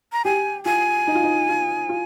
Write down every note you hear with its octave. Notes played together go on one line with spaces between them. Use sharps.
A#5
G4 G#5
F4 G#5
D#4
F4
D#4
F4
F4